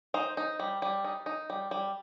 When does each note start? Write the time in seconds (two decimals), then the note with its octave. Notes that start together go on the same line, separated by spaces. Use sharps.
0.14 D#4 C5
0.37 D#4
0.59 G3
0.82 G3
1.04 D#4
1.26 D#4
1.50 G3
1.71 G3